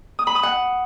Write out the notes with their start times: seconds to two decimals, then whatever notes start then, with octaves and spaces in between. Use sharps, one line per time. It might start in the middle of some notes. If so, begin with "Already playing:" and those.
0.19 D#6
0.27 B5
0.35 D#6
0.43 F#5